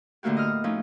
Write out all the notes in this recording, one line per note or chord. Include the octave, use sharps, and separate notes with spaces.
A2 D3 A3 A#3 F#4 G4
D#5 D#6 F6
F3 A3 C#4 D#4